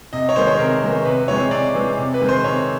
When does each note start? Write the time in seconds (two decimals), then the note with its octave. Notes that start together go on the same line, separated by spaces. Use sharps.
0.13 C3 D#5
0.29 C#5
0.36 D#3 G#3 B3 C5
0.47 C#5
0.59 C3 A#4
0.83 D#3 G#3 B3
1.05 C3 B4
1.28 E3 G#3 C4 C#5
1.51 C3 D5
1.74 E3 G#3 C4
1.98 C3
2.14 B4
2.21 D#3 G#3 C4
2.29 C5
2.44 C3 C#5